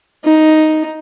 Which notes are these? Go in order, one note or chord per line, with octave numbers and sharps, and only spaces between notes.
D#4